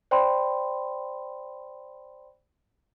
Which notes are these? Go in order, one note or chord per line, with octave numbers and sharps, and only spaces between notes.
C5 D5 G5 B5 C6